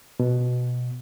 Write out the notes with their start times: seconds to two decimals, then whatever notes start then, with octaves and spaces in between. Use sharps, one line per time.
0.20 B2